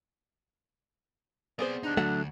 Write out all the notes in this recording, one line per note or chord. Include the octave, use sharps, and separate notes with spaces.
B3 C4 G#4 C5 D5
D4 D#4 G4
D2 F#3 A3 F#5